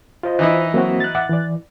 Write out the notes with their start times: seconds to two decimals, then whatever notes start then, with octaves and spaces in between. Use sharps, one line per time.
0.23 F4 C5 D#5
0.39 E3 D#4 E4
0.74 F#3 A#3 C4 F#4
1.00 F#6 A6
1.15 E5 F#5 D6
1.29 E3 D5